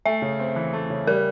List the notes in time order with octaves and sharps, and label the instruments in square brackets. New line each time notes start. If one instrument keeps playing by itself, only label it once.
[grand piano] A3 [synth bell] E5
[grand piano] C#3
C4
E3
A3
C#3
[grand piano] G3 [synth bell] A#4